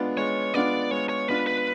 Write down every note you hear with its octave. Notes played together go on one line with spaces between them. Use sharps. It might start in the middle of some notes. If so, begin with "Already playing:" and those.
Already playing: G#3 B3 D4 F4
G#3 C#5
B3 D4 F4 D5
G#3 C#5
C#5
B3 D4 F4 B4
B4